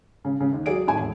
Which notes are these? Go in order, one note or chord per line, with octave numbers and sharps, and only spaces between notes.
C#3
C#3
D#2
F#3 G#4 D5 D7
G#1 A2 G#5
E1